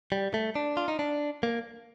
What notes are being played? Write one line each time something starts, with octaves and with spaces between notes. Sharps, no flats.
G3
A3
D4
F4
D#4
D4
A#3